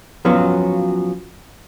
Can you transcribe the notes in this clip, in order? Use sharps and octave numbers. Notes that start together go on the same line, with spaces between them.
F3 F#3 B3 C#4 F4 F#4